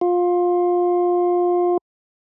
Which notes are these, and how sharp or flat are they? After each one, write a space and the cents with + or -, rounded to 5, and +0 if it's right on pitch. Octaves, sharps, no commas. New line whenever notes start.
F4 +20